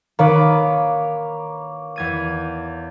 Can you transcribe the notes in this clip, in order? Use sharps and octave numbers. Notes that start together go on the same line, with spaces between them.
D#3 A#3 B4 C#5 D6 D#7
E2 G#6 D#7